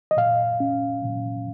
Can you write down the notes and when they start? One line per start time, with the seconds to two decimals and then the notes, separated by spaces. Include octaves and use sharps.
0.11 D#5
0.17 A#2 F5
0.60 C#4
1.05 A#2